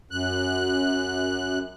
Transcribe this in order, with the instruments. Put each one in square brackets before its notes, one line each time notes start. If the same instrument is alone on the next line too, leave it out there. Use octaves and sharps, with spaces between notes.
[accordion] F#2 F#6